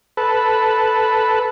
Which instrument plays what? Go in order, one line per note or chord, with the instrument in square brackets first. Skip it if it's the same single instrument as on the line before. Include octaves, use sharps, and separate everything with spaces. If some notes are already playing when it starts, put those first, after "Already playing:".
[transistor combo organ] A4 B4